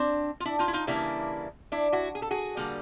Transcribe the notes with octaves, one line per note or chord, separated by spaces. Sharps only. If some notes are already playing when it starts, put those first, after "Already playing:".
Already playing: C4 D4
F4
D4 E4
D#4 F4
E4
D#4 F4
C#3 E3 G3 A#3 D4 E4
D4 E4
E4 F#4
G#4
A4
F#4 G#4
D3 G3 A#3